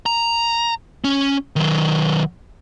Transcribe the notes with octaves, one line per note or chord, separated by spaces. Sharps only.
A#5
C#4
D#3 F#3